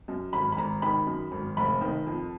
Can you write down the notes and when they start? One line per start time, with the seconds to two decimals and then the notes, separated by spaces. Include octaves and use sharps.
0.08 F#2
0.33 G#1 B5
0.52 B5
0.57 G#1 A#5
0.82 D#3 B5
1.07 F#2
1.32 G#1
1.57 F1 B5
1.81 D#3
2.07 F2